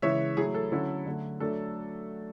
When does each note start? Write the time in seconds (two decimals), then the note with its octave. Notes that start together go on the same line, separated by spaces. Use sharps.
0.02 C#3 E3 G#3 C#5 E5
0.37 F#3 A3 E4 G#4
0.54 A4
0.72 D3 F#3 C#4 E4
1.06 D3 F#3 A3
1.40 F#3 A3 D4 A4